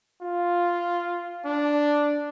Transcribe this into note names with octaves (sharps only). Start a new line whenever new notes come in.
F4
D4